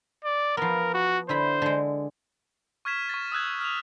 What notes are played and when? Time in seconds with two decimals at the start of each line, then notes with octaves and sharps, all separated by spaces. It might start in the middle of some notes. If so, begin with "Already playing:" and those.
0.24 D5
0.57 F3 B3 A#4
0.94 F#4
1.29 D3 E4 C5 B5
1.62 D3 G#3
2.85 C#6 F6 G#6 B6 E7
3.09 C#6 A6
3.32 D#6 E6 F#6 G#6
3.61 F6 F7